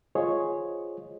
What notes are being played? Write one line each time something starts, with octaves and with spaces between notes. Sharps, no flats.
F4 G#4 C5 C#5 D#5